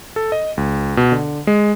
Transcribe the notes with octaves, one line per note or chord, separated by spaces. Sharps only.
A4
D#5
C#2
B2
D3
G#3